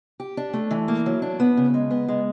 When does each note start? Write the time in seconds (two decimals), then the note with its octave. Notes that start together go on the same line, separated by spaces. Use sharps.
0.20 G4
0.37 D4
0.53 A3
0.71 E3
0.88 A#3
1.06 F#3
1.22 D4
1.40 B3
1.57 C#3
1.74 G#3
1.91 B3
2.08 G#3